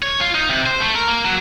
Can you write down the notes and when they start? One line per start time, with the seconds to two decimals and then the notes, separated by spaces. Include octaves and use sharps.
0.03 C#5
0.21 F4
0.35 D#4
0.48 C3
0.66 C5
0.80 A3
0.95 A#4
1.08 A#3
1.25 F#3